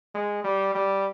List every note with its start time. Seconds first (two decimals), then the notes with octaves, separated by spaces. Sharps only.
0.15 G#3
0.44 G3
0.75 G3